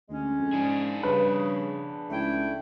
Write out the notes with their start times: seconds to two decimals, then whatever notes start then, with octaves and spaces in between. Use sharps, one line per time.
0.10 D2 G#3 C#4
0.39 F2
0.53 G#2 D4 G#4
1.03 G2 C#3 B4
2.10 C#2 A3 E4 G5